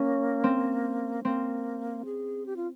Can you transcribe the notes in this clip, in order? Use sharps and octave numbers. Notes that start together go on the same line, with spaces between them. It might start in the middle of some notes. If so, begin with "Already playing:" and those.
Already playing: A#3 C#4
C4
A#3 C4
G#4
G4
F4